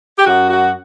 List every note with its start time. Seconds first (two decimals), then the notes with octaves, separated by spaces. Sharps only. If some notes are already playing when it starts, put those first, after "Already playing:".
0.18 G4
0.26 F#2 F#4
0.50 F#4